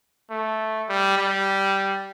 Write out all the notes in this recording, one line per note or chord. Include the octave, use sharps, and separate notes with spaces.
A3
G3
G3